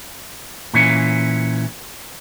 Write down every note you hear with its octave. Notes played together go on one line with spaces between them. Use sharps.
A#2 E3 C#4